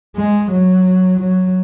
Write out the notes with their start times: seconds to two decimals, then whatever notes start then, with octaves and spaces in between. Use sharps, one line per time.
0.16 G#3
0.52 F#3
1.20 F#3